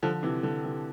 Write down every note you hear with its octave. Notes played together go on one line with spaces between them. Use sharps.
D3 F3
C3 E3
D3
C3 E3